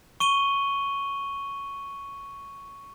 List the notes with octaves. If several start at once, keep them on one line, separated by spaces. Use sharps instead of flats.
C#6 D#7 G7